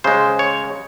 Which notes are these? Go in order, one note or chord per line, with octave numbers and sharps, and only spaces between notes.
C#3 G#3 C5
C#5